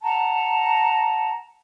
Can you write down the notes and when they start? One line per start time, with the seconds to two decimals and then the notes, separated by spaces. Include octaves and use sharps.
0.02 F#5 A5 A#5